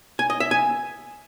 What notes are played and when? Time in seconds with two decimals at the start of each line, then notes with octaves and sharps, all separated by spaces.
0.19 G#5
0.30 D#5
0.40 E5
0.51 G#5